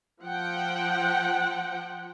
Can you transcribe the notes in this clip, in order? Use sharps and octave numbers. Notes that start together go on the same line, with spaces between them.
F3 F#5 G5